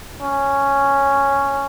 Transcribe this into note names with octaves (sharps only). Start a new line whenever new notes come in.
C#4